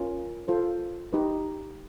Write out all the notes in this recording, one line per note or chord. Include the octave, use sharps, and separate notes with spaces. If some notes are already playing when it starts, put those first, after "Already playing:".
Already playing: C#4 F4 A#4
F4 A4 C5
D#4 G4 B4